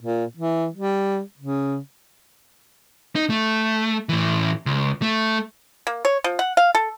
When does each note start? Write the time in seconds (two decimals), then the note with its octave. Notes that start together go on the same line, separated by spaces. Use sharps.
0.02 A#2
0.37 E3
0.74 G3
1.39 C#3
3.16 D#4
3.30 A3
4.09 A2 E3
4.66 C#2
5.02 A3
5.87 A#3
6.05 C#5
6.24 F3
6.39 F#5
6.57 F5
6.75 A4